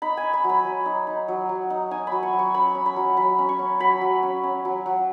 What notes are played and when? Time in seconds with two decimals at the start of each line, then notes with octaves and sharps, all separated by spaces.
0.02 D#4 B5
0.17 G#5
0.23 D#4
0.33 B5
0.44 F#3
0.49 B5
0.65 F#3
0.86 D#4
1.07 D#4
1.28 F#3
1.49 F#3
1.70 D#4
1.91 D#4 G#5
2.07 B5
2.12 F#3
2.23 C#6
2.33 F#3
2.39 C#6
2.54 C#4 B5
2.75 C#4
2.86 B5
2.96 F#3
3.17 F#3 B5
3.38 C#4
3.49 C#6
3.59 C#4
3.80 F#3 B5
4.01 F#3
4.23 C#4
4.43 C#4
4.65 F#3
4.86 F#3